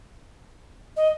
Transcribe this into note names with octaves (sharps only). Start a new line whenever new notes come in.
D#5